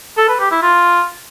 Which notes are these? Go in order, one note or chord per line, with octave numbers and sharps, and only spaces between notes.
A4
B4
G4
E4
F4